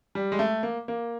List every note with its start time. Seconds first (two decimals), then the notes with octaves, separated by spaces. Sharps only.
0.15 G3
0.32 G#3
0.39 A3
0.63 A#3
0.88 A#3